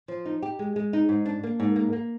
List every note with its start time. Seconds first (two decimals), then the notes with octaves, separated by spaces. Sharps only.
0.08 F3
0.25 D#4
0.42 G4
0.59 G#3
0.76 G#3
0.93 D#4
1.09 G#2
1.25 D4
1.43 A#3
1.60 G#2
1.76 A#3
1.93 A#3